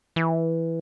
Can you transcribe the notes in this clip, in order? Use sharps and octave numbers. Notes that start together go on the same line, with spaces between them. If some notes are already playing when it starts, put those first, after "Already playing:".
E3